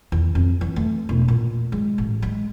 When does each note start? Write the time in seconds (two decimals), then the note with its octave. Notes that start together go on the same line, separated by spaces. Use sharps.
0.12 E2
0.35 F2
0.61 E3
0.76 A3
1.09 E1
1.28 A#2
1.72 G#3
1.98 A1
2.22 G#3